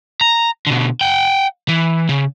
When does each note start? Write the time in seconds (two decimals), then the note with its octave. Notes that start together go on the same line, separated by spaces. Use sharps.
0.21 A#5
0.67 B2 D3
1.01 F#5 G5
1.69 E3
2.09 C#3